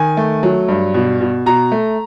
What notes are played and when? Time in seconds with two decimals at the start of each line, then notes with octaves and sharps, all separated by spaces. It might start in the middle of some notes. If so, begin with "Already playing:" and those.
Already playing: D#3 G#5
0.17 A3
0.43 F#3
0.68 G2
0.94 B2
1.20 B2
1.46 B2 A#5
1.72 A3